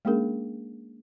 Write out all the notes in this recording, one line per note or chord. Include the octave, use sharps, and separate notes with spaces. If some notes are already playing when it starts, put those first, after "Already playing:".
G#3 A#3 C#4 D4 G#4 A#4